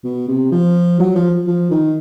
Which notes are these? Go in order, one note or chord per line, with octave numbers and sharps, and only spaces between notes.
B2
C3
F3
F#3
F3
F3
D#3